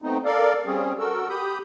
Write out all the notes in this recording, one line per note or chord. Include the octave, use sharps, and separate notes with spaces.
A3 B3 C4 D#4
A4 A#4 D5 F5
G3 C4 C#4 G#4
F#4 A4 A#4 E6
G4 B5 D#6 G6